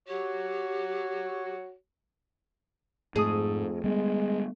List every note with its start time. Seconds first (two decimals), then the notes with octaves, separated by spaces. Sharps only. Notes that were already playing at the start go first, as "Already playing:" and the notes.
0.08 F#4 G4 C#5
3.16 F2 G#2 A3 G#4 D#6
3.84 G3 G#3 B3